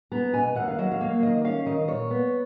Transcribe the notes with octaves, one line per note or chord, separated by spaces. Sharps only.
B3 A#5
B2 G#5
D#2 F#5
F5
F#3 D#5
F5
A#3
D#3 D#5
C#4 F5
D#3 D#5
A#2 C#5
B3